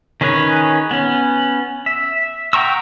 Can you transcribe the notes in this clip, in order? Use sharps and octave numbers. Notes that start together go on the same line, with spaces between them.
D#3 C#4 G#4 B4 C#5
B3 C#4
E5
F#5 G5 A#5 C#6 E6